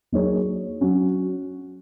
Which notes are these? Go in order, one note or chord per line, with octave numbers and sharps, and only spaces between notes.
F#3 A#3 D#4 G#4 C#5
F#3 C#4 F#4